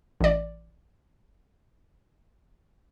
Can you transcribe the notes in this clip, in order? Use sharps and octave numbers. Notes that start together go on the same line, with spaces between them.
A1 D5